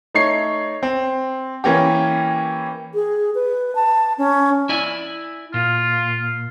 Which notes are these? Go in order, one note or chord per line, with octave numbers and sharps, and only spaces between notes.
A3 D#4 C#5 C7
C4
E3 A#3 C#4 G4
G#4
B4
A5
C#4
E4 D5 G#5
A#2 F4